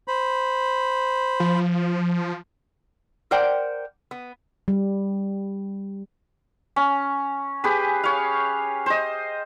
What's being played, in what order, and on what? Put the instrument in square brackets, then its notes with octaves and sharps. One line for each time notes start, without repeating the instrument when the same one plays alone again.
[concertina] C5 B5
[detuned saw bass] F3
[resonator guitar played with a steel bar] A#4 C5 D5 F#5 G5
B3
[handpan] G3
[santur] C#4
G4 G#4 B4
C#5 F5
C5 D#5